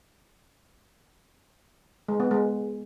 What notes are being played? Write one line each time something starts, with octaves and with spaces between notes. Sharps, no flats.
G#3
B3
G#3